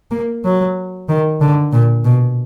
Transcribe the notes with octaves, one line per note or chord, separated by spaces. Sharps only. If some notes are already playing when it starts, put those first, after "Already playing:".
A#3
F#3
D#3
D3
A#2
B2